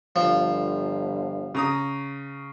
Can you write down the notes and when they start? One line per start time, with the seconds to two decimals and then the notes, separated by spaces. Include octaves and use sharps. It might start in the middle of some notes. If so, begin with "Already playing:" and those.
0.16 G1 F3
1.55 C#3 A#5 D#6